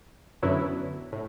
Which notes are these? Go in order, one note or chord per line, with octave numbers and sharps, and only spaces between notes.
F#2 D3 F#3 B3 E4
A2